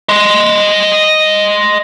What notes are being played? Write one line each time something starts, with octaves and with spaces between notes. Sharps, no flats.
D#5 C6